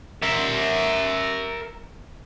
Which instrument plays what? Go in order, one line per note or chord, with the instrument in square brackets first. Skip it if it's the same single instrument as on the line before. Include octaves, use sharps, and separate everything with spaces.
[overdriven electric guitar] A#4 E5